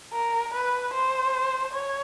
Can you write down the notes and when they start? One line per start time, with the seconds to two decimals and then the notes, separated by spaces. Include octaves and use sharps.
0.13 A#4
0.54 B4
0.93 C5
1.73 C#5